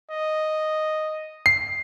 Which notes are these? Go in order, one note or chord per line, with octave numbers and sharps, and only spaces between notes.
D#5
C7